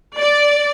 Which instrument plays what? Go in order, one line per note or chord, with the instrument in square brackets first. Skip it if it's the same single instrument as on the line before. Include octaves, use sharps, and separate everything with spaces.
[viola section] D5